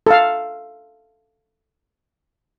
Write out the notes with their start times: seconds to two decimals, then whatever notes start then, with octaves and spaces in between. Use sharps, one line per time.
0.07 A4 F5